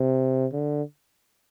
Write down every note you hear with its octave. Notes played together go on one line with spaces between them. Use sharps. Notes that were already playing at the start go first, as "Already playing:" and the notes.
Already playing: C3
D3